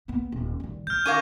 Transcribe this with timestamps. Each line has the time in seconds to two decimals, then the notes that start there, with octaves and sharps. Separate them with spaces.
0.08 A#3 B3
0.32 D#1
0.60 D#3 G3
0.87 D#3 F6 G6
1.06 C#4 A#4 F5 D6 G#6 D#7